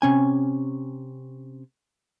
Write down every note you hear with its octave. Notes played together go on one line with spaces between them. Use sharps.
C3 C#4 G#5